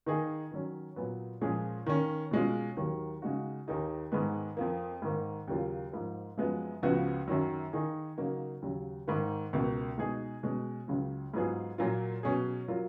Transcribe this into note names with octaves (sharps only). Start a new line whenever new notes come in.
D#3 A#3 D#4 G#4
D#3 F#3 C#4
A#2 F#3 B3
A#2 F3 G#3 C#4 G#4
D#3 A#3 C#4
B2 G#3 C#4 F4
D#2 D#3 F#3 A#3
C#3 G#3 D#4 F#4
D#2 D#3 A#3 D#4 G#4
G#2 D#3 G#3 B3
F2 F3 A#3
G#2 D#3 A#3
D#2 C#3 F#3 A#3 F4
G#2 F3 A#3
F#2 F3 G#3 B3
C#2 C#3 F3 B3 F#4
F#2 D#3 F#3
D#3 A#3 D#4 G#4
C#3 F#3 A#3 D#4 F#4
D#2 C#3 F#3
G#2 D#3 A#3
C#2 B2 A#3
B2 G#3 D#4 G#4
B2 G#3 C#4
C#2 C#3 F#3
G#2 F#3 B3 F4 G#4
A#2 F#3 A#3 F4
B2 F#3 C#4 G#4
F#3 A#3 F4